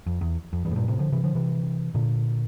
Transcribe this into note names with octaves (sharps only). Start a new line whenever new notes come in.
F2
E2
F2
E2 G2
A2
G2 A#2
A2 C3
D3 F3
C3 E3
D3 F3
C3 E3
A#2 D3